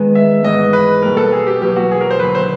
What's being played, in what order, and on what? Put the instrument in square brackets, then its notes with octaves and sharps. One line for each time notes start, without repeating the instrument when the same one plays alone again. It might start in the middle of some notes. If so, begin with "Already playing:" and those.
Already playing: [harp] D#3 G#3 B3
[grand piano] E5
[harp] G#2 E3 G#3 B3 [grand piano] D#5
[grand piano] B4
[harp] B2 G3 A#3 [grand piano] A#4
[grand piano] A4
G#4
G4
[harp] E2 B2 F#3 A#3 [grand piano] G4
[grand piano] F#4
G#4
A#4
C5
[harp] D#2 D3 F#3 [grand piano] B4
[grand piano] C5